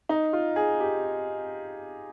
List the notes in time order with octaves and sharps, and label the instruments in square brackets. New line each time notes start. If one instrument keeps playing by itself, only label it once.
[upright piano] D#4
F4
G#4
G4